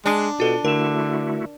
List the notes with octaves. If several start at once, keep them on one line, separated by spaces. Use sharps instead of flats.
G#3 D4
B2 F4 A4
D3 A3 E4 F#4 A#4 E7